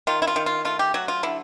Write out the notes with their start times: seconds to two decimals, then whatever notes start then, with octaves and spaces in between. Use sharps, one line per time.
0.07 D#3 F4
0.22 E4
0.27 F4
0.36 D#3
0.46 F4
0.65 A3 F4
0.79 G4
0.94 F#3 F#4
1.08 F4
1.23 D3 E4